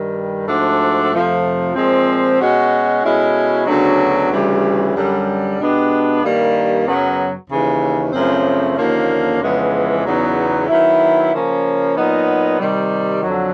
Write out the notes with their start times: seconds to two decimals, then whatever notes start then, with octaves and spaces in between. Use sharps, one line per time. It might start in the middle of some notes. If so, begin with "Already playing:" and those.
Already playing: G2 D#3 G3
0.47 G#2 F3 A3 D4 F#4
1.11 F2 C3 F3 A3
1.75 A#2 F3 G#3 C4
2.39 B2 G#3 C#4 F#4
3.02 B2 G#3 C#4 E4 A4
3.66 D2 C#3 F#3 B3 D4
4.30 D2 C#3 E3 G3
4.93 F#2 D3 G3
5.58 B2 G#3 B3 D4 G4
6.21 G2 D#3 G3 A#3
6.85 F#2 C#3 F#3 B3
7.49 D#2 C#3 E3
8.12 F#2 C#3 F3 A3 C4
8.77 D#2 D3 F3 A#3 C#4
9.41 F2 C#3 E3 G#3 B3
10.05 E2 C#3 F#3 B3 D#4
10.68 D#3 F#3 B3 E4
11.33 C#3 F3 A#3 C#4
11.96 A#2 F#3 B3 D#4
12.59 C3 D#3 G3
13.23 F2 D3 F#3